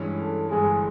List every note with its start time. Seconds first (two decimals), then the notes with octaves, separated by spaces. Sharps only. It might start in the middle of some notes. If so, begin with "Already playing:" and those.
Already playing: G2 E3 G#3 C#4
0.19 A4
0.49 G1 G2 E3 G#3 G#4